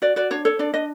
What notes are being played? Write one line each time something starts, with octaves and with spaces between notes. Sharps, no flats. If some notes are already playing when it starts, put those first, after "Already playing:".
F#4 D5
F#4 D5
D4 C#5
A4 C#5
D4 D5
D4 D#5